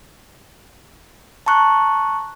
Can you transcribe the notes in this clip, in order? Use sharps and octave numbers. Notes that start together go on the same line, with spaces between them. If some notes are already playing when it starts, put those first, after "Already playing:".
A5 A#5 C#6 F#6